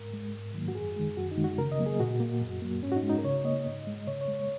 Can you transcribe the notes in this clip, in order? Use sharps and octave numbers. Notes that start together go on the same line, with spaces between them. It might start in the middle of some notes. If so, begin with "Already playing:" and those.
Already playing: G#2 A#4
G#3
G#2
D#3 F#3 A#3
F#4
F#2 G#4
D#3 G#3
F#2 F#4
D#4
D#3 G#3
F#4
C#3 A#4
D#5
F#3 A#3
G#4
A#2 F#4
A#3
F#2
F#3 A#3
G#2 C#4
F#4
D#4
G#3
D#4
A#4
C#3 C#5
A#3 D#5
G#2
G#3
C#3 C#5
C#5
G#3
C#5